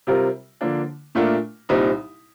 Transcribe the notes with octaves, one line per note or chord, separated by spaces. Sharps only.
C3 G3 C4 F4 A#4
D3 F3 A#3 D4
A#2 A3 D4 F4 A#4
C2 A#2 G3 C4 D#4